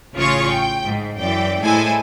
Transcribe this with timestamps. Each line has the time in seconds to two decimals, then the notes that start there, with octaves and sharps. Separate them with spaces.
0.15 A1 C#3 F4 G#4 C#5 C#6
0.47 G5
0.86 G#2
1.19 F#2 E3 D5 G5
1.63 A2 G#3 E4 A4 C5 G#5